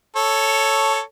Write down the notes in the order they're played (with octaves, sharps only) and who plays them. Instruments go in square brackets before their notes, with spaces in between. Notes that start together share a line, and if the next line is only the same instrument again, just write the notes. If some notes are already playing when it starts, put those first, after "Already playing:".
[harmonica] A4 C#5